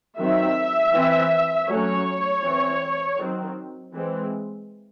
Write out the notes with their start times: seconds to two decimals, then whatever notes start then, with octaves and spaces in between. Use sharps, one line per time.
0.17 D#3 F#3 C4 E5
0.93 E3 C4
1.68 F#3 A3 C#4 C#5
2.43 E3 C4
3.18 D#3 F#3 C4
3.93 E3 G#3 C4